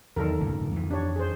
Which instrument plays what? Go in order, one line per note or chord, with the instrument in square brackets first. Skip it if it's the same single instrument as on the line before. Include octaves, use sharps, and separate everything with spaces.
[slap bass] E2 F#3 [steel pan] D#3 A4 A#4
[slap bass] D1 C#2 G2
F2 E3
[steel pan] D4 G4 C#5
G#4 C5